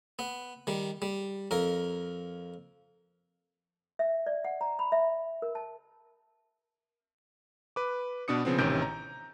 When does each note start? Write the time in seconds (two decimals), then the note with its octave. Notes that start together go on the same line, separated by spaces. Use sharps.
0.19 B3
0.67 D#3 G3
1.02 G3
1.51 F2 A#4
3.99 E5
4.26 D5
4.45 F#5
4.61 A#5
4.79 B5
4.92 E5
5.42 A#4
5.55 A5
7.76 B4 D6
8.28 B2 B3 D4 D#6 C#7
8.45 C#3 F3 B3 C4
8.58 A1 C3 D#3 C#4 G6 D7
8.82 A#5